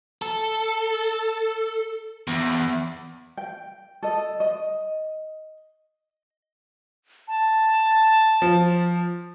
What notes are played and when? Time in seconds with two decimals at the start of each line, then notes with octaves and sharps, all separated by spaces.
0.22 A4
2.27 E2
3.37 G5
4.03 A4 D#5
4.40 D#5
7.28 A5
8.42 F3